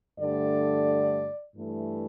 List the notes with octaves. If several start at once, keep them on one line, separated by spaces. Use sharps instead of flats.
G2 D3 A3 D5
G2 E3 A3